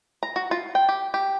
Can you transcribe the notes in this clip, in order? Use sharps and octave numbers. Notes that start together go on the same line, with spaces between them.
A#5
F#4
F4
G5
G4
G4